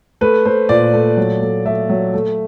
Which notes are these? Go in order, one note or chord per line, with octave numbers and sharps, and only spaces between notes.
A3 B4
A3 C5
A#2 D5
A3
F#3
A3
A3 E5
F#3
A3